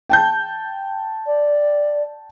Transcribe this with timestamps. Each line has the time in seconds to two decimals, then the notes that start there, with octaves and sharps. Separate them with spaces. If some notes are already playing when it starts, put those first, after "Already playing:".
0.09 G5 A5 G6
1.27 D5